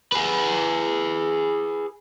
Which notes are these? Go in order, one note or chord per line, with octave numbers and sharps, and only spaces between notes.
G#4 B4